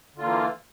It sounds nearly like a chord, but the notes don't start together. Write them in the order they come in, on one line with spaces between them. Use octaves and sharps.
D3 F4 A#3 E3